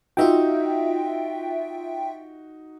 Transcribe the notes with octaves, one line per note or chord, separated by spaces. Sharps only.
D#4 F4 F#4 E5 G5